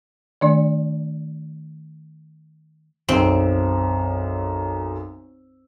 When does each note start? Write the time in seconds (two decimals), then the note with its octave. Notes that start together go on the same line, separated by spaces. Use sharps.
0.41 D#3 A3 D4 D5
3.09 B1 F#2 C4